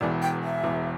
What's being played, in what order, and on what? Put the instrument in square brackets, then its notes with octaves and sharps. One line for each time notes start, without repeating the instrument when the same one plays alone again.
[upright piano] E1 E2 E3 [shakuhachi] D5
[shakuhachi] G5
E5
[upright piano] E1 E2 E3